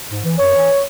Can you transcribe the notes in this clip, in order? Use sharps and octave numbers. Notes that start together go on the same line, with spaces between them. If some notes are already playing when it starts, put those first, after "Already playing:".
G#2
E3
F#2 C#5
E3